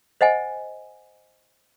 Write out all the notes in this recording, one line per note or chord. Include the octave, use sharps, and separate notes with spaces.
C5 D#5 F#5 G#5